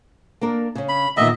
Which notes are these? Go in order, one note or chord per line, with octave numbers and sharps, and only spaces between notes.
A#3 D4 A#4
C#3 C#4
B5
E2 A#2 D#3 D#5 E5